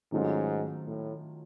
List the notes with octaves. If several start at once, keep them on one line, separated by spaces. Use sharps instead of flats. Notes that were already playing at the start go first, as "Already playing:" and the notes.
G#2 D#3 F#3 A3 C#4 F4
A2